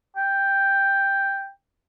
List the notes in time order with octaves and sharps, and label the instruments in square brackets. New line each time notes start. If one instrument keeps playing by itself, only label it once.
[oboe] G5